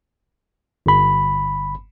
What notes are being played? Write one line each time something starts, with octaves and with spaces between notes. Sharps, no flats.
G1 B5